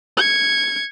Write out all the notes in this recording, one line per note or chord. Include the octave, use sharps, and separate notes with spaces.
G#6 C#7